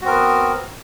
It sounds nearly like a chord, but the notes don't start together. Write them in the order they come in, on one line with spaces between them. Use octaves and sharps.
F#4 C4 A#4 B3